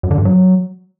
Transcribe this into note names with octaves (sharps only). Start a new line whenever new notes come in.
F#2
D3
G2
F#3